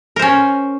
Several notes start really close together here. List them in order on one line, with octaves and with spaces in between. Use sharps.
A#4 C5 C#4